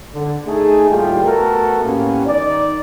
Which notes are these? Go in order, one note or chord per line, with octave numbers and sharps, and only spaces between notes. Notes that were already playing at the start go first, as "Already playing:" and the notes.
D3
A3 D#4 G#4
D#2 A2 G3 F4 G5
A3 B3 F#4 A4 A#4
A2 A#3 B3 C#4 G4
D#3 D#4 D5